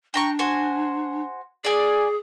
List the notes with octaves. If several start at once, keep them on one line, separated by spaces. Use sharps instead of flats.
D4 G5 A#5 C#6
F#4 C5 G#5
G#4 D5 G#5